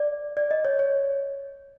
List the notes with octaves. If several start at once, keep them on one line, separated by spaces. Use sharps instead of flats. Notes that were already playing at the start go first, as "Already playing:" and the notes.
Already playing: D5
D5
D#5
C#5
C#5